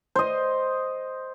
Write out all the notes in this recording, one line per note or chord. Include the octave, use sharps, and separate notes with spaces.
C5 D#5